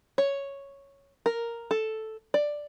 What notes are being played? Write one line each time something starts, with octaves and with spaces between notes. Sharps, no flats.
C#5
A#4
A4
D5